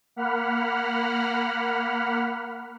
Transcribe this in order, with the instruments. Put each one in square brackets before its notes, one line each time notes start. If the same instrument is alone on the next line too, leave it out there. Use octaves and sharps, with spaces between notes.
[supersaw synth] A#3 F#5 B5 F6